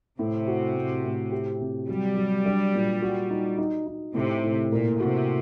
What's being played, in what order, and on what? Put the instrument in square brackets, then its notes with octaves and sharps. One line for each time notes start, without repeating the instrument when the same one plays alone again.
[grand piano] A2 [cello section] C3
[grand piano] F#4
A2
A2
G4
C3
[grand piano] F#3 [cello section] G3
[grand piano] F#3
D4
A#2
F#4
D#4
D#4
D#4
[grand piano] A2 [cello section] C3
[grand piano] A2
[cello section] A#2 [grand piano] A#3
[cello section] C3 [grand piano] F#4